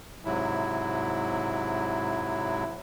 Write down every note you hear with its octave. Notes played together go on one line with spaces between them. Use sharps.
G#2 C3 F#3 E4